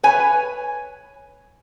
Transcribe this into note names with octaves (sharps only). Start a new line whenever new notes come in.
B4 C#5 G#5